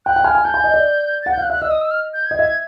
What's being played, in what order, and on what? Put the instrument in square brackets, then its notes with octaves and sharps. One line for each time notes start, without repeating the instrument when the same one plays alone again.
[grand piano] G5 [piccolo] F#6
[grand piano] G5
[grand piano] G#5 [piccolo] F6
[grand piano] G#5
[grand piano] A5 [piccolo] G6
[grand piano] G#5
D#5
D5
[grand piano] F#5 [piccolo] A6
[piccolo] G6
[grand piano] F5 [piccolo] F#6
[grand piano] E5 [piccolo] F#6
[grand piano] D#5 [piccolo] E6
[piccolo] D#6
E6
F6
G6
G#6
[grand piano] D#5
[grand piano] E5 [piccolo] G#6